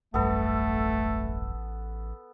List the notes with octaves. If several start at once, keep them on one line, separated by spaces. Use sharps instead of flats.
D#1 A1 F#2 G3 A3 B3 A4